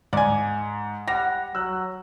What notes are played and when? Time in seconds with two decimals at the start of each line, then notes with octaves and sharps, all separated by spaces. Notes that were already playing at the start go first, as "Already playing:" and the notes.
0.13 G#2 D5 G#5
1.08 G3 F#5 A#6
1.55 F#3 E6 F#6